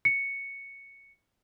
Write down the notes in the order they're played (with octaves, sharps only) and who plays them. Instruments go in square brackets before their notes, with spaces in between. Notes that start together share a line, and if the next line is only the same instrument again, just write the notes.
[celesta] C#7